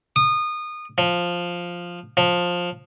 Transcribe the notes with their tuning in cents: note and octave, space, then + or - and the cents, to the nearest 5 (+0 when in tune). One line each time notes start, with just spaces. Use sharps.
D#6 -25
F3 +5
F3 +15